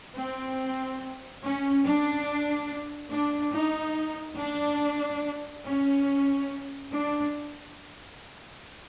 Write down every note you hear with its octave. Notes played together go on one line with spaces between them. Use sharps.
C4
C#4
D4
D4
D#4
D4
C#4
D4